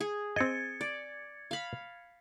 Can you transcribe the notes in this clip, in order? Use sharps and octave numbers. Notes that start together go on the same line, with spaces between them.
G#4
C4 D#5 G#6 A6 C#7
D5
F5 B5